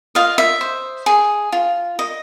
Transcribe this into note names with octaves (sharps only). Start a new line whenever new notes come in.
F4 D#5 F5
E5
C5
G#4
F4
D#5